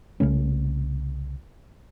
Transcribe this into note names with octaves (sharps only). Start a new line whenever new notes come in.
C2 C#3 A3 C#4